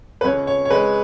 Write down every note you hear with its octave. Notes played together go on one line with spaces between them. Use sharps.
B4
C#2 C#5
C#5
C#5
G#3 B4